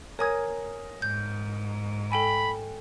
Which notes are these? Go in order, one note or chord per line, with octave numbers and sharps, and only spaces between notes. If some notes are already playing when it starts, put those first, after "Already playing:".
A#4 C#5 G#5 D#6 G#6
G#2 G6
A4 G5 G#5 B5